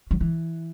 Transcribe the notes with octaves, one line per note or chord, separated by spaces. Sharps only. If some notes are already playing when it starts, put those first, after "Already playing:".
F#3
E3